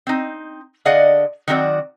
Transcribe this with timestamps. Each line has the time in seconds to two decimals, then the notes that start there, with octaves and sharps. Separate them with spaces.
0.07 C4 D#4
0.85 D3 G#4 D5 D#5 F5 F#5
1.48 D#3 F#3 C4 F#4 A#4 D5